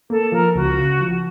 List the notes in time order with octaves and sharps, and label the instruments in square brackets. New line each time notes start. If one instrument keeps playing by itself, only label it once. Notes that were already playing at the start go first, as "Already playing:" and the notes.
[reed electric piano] A#3 [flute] A4
[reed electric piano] F3 [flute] A#4
[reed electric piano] C#2 [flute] F#4
[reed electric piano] C#3
F3